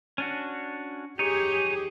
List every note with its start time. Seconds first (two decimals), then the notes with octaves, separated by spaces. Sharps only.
0.18 C#4 D4 F#4
1.19 D#4 G4 G#4 C#5